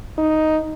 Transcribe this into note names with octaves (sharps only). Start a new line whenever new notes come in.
D#4